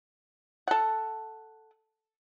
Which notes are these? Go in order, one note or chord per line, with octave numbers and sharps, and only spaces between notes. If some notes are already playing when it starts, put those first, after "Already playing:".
A4 F#5